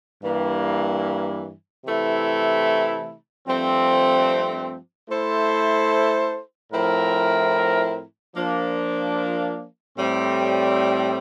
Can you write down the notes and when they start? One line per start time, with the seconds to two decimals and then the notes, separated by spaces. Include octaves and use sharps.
0.21 G2 E3 A#3
1.85 C3 E3 A3 E4
3.47 G2 F3 A3 C4
5.09 A3 E4 A4 C5
6.72 A2 F3 C4 E4 A#4
8.35 F3 A#3 D4
9.98 A2 G3 C4